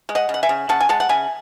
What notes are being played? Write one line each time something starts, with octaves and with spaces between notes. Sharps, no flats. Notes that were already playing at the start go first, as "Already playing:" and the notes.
G#3
D#5 F#5
C#3
F#5
E5 G#5
C#3
C#3 F#5 A5
G#5
G#3 F#5 A5
F#5
C#3 E5 G#5